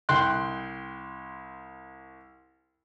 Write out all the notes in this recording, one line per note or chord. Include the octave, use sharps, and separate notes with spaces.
C2 G5 C6 F#6